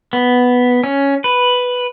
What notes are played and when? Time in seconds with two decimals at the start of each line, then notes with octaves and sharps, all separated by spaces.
0.13 B3
0.84 C#4
1.24 B4